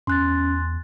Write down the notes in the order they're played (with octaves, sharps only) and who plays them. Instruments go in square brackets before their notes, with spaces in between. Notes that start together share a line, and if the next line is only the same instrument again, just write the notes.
[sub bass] E2 [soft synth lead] C#4 [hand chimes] C6 F#6 A6